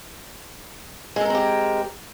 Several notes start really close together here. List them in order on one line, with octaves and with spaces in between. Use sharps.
G#3 A4 A#4 C4 G4